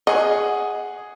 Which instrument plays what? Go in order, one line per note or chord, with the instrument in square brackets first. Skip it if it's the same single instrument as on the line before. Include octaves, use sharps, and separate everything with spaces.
[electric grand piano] G#4 F#5 [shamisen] D#5